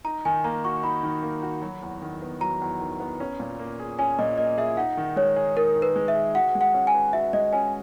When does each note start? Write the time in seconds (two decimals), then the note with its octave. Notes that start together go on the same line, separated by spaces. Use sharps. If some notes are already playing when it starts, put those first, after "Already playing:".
0.04 D#4 A#5
0.25 D#3 G#5
0.44 A#3 A#5
0.64 F#4 C#6
0.83 D#4 B5
1.03 D#3
1.23 A#3
1.42 F#4
1.62 F#3
1.82 E2
2.02 D#3
2.22 B3
2.41 F#3 A#5
2.62 E2
2.81 D#3
3.00 B3
3.20 C#4
3.40 A#2
3.59 A#3
3.79 G#4
3.99 C#4 G#5
4.19 A#2 D#5
4.38 A#3 D#5
4.58 G#4 E5
4.77 D#4 F#5
4.97 D#3
5.16 G#3 C#5
5.36 G#4
5.56 D#4 A#4
5.76 D#3
5.82 B4
5.96 G#3
6.08 E5
6.15 G#4
6.35 F#4 F#5
6.55 G#3
6.61 F#5
6.74 C#4
6.87 G#5
6.94 B4
7.13 F#4 E5
7.33 G#3 D#5
7.53 C#4 G#5